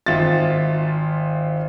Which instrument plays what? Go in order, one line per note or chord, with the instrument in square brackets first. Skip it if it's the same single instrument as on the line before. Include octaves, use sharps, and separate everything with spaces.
[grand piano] G#1 F4 E5 A6